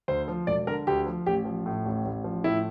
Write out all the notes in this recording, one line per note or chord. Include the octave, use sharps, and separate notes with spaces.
D2 C5
F3
E1 D5
D3 A#4
D2 G4
F3
A1 G4
F3
A2
A1
A1
F3
A2 E4